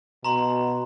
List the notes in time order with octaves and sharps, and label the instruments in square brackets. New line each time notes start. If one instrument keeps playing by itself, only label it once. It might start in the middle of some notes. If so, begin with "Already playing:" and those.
[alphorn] B2 [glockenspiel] A#5 C6